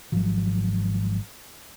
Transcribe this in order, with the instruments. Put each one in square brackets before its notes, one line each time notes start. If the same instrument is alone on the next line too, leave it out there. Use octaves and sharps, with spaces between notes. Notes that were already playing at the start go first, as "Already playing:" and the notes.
[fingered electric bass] G#1 G#2 F3 F#3